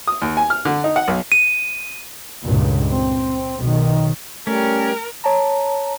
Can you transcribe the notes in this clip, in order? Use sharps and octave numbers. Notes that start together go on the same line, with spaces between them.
D#6
D#2
G#5
F6
D3
D#4
F#5
B1
D#7
C#2 G2 A#2
C4
B1 D#3
G3 A3 C#4 A#4
C#5 A5 A#5